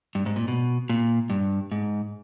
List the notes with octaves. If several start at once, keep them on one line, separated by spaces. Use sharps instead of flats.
G2
G#2
A#2
B2
A#2
G2
G#2